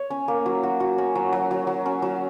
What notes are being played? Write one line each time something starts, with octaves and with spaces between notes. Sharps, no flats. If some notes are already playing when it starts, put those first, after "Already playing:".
Already playing: C#5
C#4
A#3
F#3
F#4
F#4
C#4
F#3
F#3
F#3
F#3
C#4
F#3